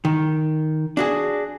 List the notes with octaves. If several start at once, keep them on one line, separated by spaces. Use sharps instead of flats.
D#3
D4 F#4 G#4